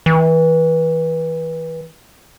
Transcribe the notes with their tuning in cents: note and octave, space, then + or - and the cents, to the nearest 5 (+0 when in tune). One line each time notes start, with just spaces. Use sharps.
E3 -25